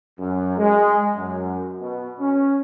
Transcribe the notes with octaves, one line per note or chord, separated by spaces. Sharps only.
F#2
G#3
F#2
B2
C#4